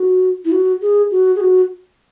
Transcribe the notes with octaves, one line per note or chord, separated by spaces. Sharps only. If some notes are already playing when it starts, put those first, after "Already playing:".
Already playing: F#4
E4
F#4
G#4
F#4
G#4
F#4